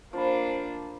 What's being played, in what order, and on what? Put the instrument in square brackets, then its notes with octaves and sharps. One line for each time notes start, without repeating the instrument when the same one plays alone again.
[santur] F3 B5 [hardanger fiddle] A#3 D4